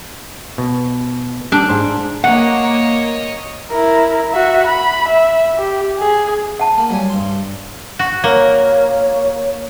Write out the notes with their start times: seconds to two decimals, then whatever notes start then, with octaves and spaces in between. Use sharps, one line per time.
0.58 B2
1.52 G3 D4
1.69 G#2 C5
2.24 A#3 C#5 D#5 F#5
3.70 E4 A#4
4.32 F#4 E5
4.66 B5
5.08 E5
5.57 G4
5.99 G#4
6.60 F#5 A5
6.78 A#3
6.90 F#3 G3 G#5
7.10 G2 C6
7.99 F#4
8.24 A#3 C#5